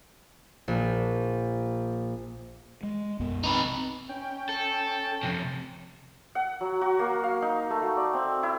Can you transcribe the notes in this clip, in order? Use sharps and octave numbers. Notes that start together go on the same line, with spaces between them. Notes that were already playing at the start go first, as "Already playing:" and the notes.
A#1
G#3
B1 F#2 B3
C4 D#4 B4
C#4 G5
A4
F2 C3
F#5
F#3
F#4
A#3
F5
D#4
A3
F#4
D5
C4
E4